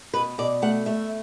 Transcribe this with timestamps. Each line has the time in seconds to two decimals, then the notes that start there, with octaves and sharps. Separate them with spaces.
0.14 B2 B4
0.38 B2 D5
0.62 A3 F#5
0.86 A3 E5